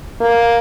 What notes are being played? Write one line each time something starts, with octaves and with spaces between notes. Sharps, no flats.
A#3